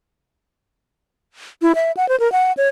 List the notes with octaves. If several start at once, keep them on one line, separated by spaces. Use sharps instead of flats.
E4
E5
F#5
C5
A#4
F#5
C#5